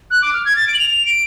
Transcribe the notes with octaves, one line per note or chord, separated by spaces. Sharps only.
F#6
D6
F6
G#6
A6
D7
F#7
F7
F7
D7